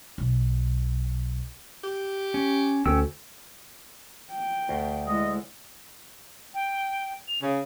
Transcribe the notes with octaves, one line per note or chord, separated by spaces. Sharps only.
B1
G4
C#4
D2 C#4 G5 E6
G5
D2
G#3 E4 D#5
G5
F7
C#3 G#5